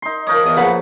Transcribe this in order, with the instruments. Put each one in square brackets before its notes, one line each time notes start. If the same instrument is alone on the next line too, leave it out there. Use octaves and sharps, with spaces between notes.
[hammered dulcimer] D#4 C6
[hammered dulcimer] F3 A#4 C#5 [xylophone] D#6 G6
[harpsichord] E2 D#5 E5
[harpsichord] A#1 [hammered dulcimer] F#3 [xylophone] G#4 F5 G6 [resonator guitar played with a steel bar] B4 F#5